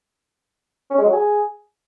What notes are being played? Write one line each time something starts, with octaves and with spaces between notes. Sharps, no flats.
C#4
G#3
F#3
G#4